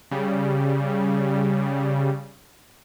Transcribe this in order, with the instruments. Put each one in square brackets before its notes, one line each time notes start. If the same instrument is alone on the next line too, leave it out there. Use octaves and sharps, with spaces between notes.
[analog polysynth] C#3 G3